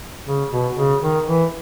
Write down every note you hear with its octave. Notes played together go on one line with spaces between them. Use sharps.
C#3
B2
C#3
D#3
E3